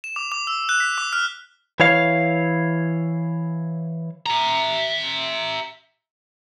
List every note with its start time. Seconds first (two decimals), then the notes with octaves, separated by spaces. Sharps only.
0.04 E7
0.16 D6
0.32 D6
0.47 E6
0.69 F#6
0.80 B6
0.98 D6
1.13 F6
1.80 E3 E4 C#5 F5
4.26 E5 A#5